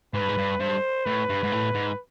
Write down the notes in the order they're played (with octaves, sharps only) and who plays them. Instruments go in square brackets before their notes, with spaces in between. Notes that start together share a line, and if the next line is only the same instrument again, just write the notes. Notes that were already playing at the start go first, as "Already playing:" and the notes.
[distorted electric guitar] G#2 [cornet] B4
[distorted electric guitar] G2
G#2
G2
[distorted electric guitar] G2 [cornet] C5
[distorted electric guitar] A2 [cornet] B4
[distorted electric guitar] G2
G#2
A2
G#2